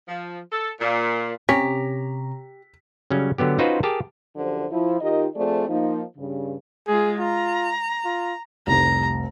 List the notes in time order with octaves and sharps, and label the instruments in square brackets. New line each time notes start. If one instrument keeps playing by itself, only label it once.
[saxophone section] F3
A4
A#2
[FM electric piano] C3 C#5 A#5 [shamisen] C#4 [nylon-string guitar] G4 [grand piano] B6
[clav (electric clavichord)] C#3 F#3 G3 C#4
D3 F#3 B3 G4
C#4 D#4 F4 F#4 B4 C5
G4 G#4 A#4 A5
[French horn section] F#2 D3 F3 G4 C5
F3 E4
D#3 D#4 F4 G4 A#4 D#5
F3 A3 C4 G#4 D5
F3 A#3 D#4
G2 C#3
[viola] G#3 F4 [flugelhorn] G#4
[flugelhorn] F4 [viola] A#5
[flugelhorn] F4
[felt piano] F1 C2 [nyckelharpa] A#5